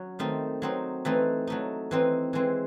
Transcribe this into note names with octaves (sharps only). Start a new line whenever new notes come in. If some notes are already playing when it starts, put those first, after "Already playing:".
Already playing: F#3 C#4
D#3 A3 C4 D#4
F#3 C4 D#4
E3 A3 C4 D#4
F#3 A3 D#4
E3 C4 D#4
E3 G#3 C4